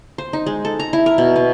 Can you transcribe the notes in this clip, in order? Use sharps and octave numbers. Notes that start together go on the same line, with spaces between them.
C5
D#4
G#3
A4
A#5
E4
A#4
B2
B3